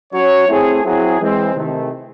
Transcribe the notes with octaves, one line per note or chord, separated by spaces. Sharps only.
F#3 C#4 F#4 C#5
A3 C4 E4 G#4
F#3 C4 E4 G#4
E3 G#3 C4
C3 D#3 A3